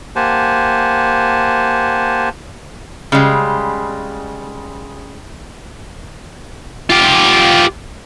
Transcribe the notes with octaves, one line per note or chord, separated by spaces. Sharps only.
A#3 G4 C5 F#5 G#5 A5
C#3 G3 G#3
F4 G4